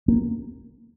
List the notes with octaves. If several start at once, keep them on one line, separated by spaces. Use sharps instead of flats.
A#3